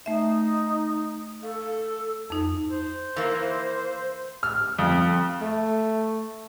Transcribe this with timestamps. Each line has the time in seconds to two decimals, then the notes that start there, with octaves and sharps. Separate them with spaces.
0.06 A3 D#4 E5
1.43 A4 F5
2.30 F2 D#4
2.71 C5
3.16 E3 A#3
4.43 F6
4.79 F2
5.41 A3